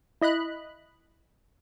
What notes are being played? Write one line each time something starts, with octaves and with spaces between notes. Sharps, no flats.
E4 D#5 B5 F#6